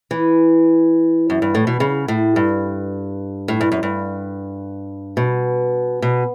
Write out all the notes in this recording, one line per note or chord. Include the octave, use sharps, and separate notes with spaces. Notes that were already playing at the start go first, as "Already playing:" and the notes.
E3
F#2
G2
A2
B2
C#3
A2
G2
A2
G2
F#2
G2
B2
B2